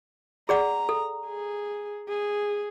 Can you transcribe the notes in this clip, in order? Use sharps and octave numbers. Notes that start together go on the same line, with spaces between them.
G#4 D5 F#5 A#5
A4
G#4
G#4